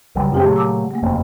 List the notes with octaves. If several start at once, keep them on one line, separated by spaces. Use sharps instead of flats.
B1 C#3 F#3 G3
F#2 A3 C4 F4 G4 G#4
A#2 F#3 A3
A5 D6 E6
A3 A#3
F#1 F2 C3